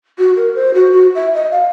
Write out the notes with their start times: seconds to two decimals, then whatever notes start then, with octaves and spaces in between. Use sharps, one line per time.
0.19 F#4
0.37 A#4
0.55 C5
0.74 F#4
0.92 F#4
1.15 E5
1.35 D#5
1.52 F5